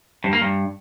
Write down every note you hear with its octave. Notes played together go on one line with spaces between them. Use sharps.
G2
A#3
G2